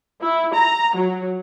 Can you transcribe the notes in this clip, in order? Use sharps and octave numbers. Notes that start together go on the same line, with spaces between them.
E4
A#5
F#3